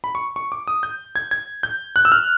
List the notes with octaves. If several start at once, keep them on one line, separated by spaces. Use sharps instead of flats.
B5
C#6
C#6
D6
D#6
G6
G#6
G#6
G6
F#6
E6
F6